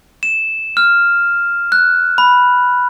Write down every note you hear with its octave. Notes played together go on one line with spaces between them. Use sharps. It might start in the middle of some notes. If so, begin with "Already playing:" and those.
E7
F6
F#6
B5